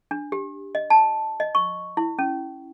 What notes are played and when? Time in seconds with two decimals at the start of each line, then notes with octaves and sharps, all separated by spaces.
0.11 D4
0.32 G4
0.75 D#5
0.90 A5
1.40 D#5
1.55 C#6
1.97 E4
2.19 C#4